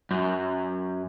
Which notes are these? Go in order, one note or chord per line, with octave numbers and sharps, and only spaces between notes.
F#2